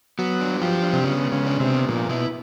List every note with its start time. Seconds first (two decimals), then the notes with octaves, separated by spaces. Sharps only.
0.19 F#3 B3
0.40 D4
0.61 F3 G4
0.82 D4
0.93 C3
1.04 C#3 B3
1.25 G#3
1.32 C#3
1.47 D4
1.60 C3
1.68 B3
1.89 A#2 F3
2.09 B2 E4